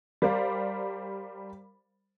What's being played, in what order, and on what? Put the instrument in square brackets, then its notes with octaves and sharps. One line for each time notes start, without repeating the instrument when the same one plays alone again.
[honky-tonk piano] G3 A#4 C5 D5 F5